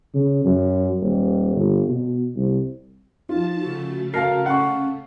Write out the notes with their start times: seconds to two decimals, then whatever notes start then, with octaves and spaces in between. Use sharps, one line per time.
0.14 C#3
0.44 F#2
1.01 D#1
1.55 G1
1.89 B2
2.35 C2
3.29 F3 D#4 F4 A5
3.60 C#3 A3 F#4
4.14 F#4 A#4 F5 A5 C7
4.46 C#4 F#5 C#6